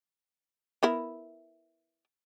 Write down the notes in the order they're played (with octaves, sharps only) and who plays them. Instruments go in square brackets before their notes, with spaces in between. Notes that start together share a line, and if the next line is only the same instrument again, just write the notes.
[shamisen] B3 E4 A#4